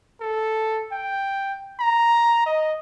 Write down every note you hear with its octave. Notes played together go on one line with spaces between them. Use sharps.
A4
G5
A#5
D#5